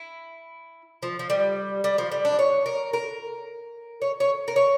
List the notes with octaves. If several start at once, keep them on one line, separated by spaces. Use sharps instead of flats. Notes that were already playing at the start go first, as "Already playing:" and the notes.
Already playing: E4
F3
F3
G3
G3
F3
G3
D4
C#5
A#4
A#4
C#5
C#5
A#4
C#5